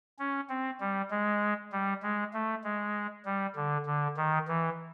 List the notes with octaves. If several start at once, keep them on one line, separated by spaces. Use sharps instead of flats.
C#4
C4
G3
G#3
G3
G#3
A3
G#3
G3
D3
D3
D#3
E3